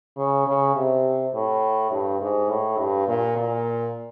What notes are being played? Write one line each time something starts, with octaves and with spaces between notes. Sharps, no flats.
C#3
C#3
C3
A2
G2
G#2
A2
G2
A#2
A#2